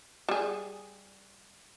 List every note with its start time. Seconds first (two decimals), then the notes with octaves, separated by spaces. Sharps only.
0.29 G3 G#4